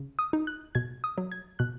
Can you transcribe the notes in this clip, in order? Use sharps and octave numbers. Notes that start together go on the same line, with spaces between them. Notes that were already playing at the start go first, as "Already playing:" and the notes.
Already playing: C#3
D#6
D#4
F#6
B2 G#6
D#6
F#3
G#6
B2 F#6